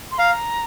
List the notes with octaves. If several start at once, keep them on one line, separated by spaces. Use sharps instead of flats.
C6
F5 A#5